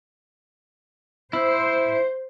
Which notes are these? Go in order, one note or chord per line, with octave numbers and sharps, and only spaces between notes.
E4 C5